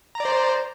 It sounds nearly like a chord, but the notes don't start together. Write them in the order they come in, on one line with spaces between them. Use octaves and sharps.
A#5 D5 C5